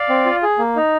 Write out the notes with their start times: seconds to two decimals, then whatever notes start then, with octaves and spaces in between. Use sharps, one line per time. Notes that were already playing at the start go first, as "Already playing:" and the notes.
Already playing: D5 F5
0.09 C4
0.26 F4
0.43 G#4
0.59 A#3
0.76 D#4